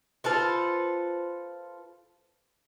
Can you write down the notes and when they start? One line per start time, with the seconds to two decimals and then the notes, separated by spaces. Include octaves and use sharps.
0.24 F4 A4 B4 C5